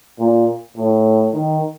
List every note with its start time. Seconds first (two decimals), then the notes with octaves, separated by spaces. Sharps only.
0.19 A#2
0.76 A2
1.33 D#3